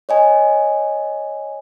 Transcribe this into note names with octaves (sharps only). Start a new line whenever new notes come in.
C#5 D#5 G#5